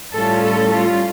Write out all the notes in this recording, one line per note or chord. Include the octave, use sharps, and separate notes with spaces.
A2 G3 C#4 F4 A4
A4
F4